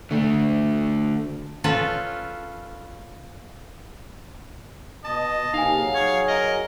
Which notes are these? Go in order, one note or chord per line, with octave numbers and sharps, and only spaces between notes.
D3 A3
C#4 F4 A4 B4
B2 D#5 A5
C3 A#3 D#4 F5 G#5
F#3 G#4
C#5
A#4 D#5